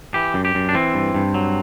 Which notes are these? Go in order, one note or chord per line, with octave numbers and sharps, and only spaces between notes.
E3 G4
F#2
G4
F#2
D4
E3 C4
G2
G2
F#3